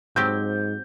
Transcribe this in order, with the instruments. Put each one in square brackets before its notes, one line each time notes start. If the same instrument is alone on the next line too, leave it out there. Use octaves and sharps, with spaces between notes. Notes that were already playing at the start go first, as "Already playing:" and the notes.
[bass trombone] G#2 [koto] F#3 C4 G4 [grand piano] G6